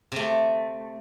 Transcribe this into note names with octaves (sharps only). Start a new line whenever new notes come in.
C3 A3